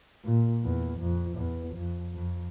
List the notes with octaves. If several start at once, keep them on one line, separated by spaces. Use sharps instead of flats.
A#2
E2
F2
E2
F2
F2